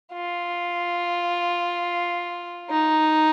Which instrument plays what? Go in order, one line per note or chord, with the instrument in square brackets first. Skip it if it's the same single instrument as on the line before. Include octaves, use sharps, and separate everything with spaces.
[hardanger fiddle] F4
D#4